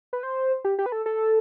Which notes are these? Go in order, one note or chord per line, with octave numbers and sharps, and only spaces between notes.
B4
C5
G4
G4
B4
A4
A4